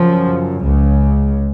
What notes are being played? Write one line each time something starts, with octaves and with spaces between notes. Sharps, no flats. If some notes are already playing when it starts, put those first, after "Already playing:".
Already playing: F#2 C#3 F3
C#2 C#3